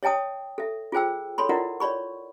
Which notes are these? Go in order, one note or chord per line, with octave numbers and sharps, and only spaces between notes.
C#5 D#5 G5 A5 D#6
A4 E5
F4 G#4 C5 G5 E6
A4 C#5 B5 C6
E4 F4 A#4 D5 D#5 F#5
C#5 D5 B5 C#6